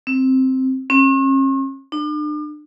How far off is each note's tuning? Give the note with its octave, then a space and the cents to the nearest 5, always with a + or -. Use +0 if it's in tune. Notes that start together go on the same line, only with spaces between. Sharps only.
C4 +0
C#4 -45
D4 +40